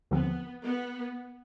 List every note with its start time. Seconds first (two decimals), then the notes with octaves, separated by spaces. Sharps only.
0.11 D#2 D3 F3 B3 C4
0.63 B3